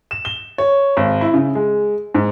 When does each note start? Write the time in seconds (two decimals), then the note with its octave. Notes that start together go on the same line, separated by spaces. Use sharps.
0.11 E7
0.25 G7
0.58 C#5
0.97 G#1
1.21 E4
1.34 C#3
1.55 G#3
2.14 G#2